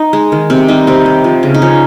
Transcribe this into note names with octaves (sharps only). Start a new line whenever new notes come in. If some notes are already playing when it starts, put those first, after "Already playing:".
Already playing: D#4 A#4
G#3
D#3
C3 C4
G3 D#4
C3 C4
C3
F3
C#3
D#4
F3 C#4